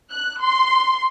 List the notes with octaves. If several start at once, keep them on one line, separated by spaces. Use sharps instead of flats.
F#6
C6